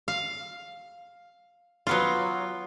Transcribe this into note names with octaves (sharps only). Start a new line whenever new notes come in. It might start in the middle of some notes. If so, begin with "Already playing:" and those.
F5
F#3 B3 F4